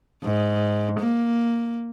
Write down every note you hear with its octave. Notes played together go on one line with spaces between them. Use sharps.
G#2
A#3